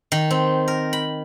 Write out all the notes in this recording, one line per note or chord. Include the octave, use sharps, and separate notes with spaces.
D#3
C4
A#4
B5